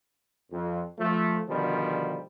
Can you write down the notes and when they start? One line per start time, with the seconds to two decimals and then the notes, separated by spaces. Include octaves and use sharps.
0.51 F2
0.98 F3 A3
1.48 B2 D3 D#3 F3 G3